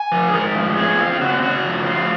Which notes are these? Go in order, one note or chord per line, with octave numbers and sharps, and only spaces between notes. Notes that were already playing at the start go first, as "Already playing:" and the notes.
Already playing: G#5
F3
G#4
G#2 A#4
F3
C4 G#4
C4 F4
F4
C#3 F#4
C#3 F#4
F3
F4